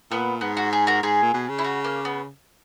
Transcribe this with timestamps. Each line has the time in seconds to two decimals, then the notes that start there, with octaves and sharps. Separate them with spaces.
0.11 A#2 B3
0.41 G#2 B3
0.57 F#4
0.73 G#4
0.87 F#4 A#4
1.03 G#2 G#4
1.22 A#2
1.34 B2
1.49 C#3
1.59 E4
1.64 F#4
1.84 A#3
2.05 B3